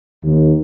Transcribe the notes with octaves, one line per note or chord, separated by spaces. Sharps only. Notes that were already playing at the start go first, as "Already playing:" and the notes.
D#2